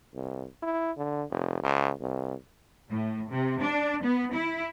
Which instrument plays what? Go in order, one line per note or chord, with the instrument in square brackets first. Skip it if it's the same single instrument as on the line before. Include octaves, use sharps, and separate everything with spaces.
[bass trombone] C2
E4
D3
F1
C#2
C2
[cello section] A2
C3
D4
B3
E4